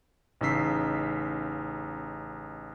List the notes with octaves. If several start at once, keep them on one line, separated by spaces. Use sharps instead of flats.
A1 C#3 D#4 E6 B6 C7